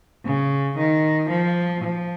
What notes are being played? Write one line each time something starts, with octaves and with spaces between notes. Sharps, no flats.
C#3
D#3
F3
F3